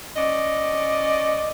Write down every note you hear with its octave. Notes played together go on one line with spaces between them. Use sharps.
C#4 D5 D#5